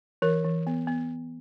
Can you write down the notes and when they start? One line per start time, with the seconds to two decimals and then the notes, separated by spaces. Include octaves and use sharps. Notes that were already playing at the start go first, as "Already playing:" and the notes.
0.22 E3 A#4
0.45 E3
0.67 B3
0.87 B3